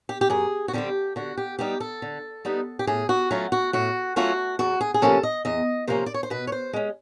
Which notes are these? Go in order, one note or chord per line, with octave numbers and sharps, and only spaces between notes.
G4
G4
F#2 G#4
F#4
D3 G3 C4 G4
D3 F#4
G4
G3 B3 D#4 G4
A4
D3
G3 B3 D#4
G4
A2 G#4
F#4
F#3 A3 C#4 F4
F#4
A2 F#4
F#3 A3 C#4 F4 F#4
E2 F#4
G#4
G#4
C3 F3 A#3 C#4 A4
D#5
E2 D#5
C3 F3 A#3 C#4 C5
D5
C#5
C5
B2 B4
C#5
C5
G#3 C#4